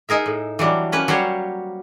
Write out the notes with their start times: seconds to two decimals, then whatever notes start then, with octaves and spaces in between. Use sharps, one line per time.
0.09 D#4 G#4 A#4 E5
0.26 A2
0.59 E3 F#3 G3 D4
0.92 A#3 C#4 B4
1.08 F#3 G3 G4 C5 C#5